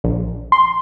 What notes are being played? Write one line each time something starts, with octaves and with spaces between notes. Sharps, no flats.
A#1
C6